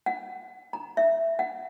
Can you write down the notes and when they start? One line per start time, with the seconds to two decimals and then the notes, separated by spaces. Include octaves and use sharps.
0.06 F#5
0.73 A#5
0.97 E5
1.39 F#5